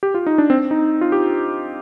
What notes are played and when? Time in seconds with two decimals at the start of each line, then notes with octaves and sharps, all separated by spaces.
0.03 G4
0.14 F4
0.27 D#4
0.38 D4
0.50 C4
0.71 D#4
1.01 F4
1.12 G4